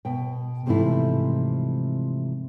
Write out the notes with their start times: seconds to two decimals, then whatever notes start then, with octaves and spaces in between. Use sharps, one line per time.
0.05 B2 G5
0.66 G#2 C3 E3 F3 A3 E4